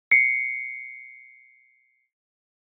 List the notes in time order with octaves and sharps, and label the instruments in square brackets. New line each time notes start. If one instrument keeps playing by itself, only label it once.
[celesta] C7 C#7